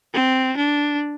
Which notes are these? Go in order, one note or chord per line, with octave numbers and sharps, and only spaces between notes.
C4
D4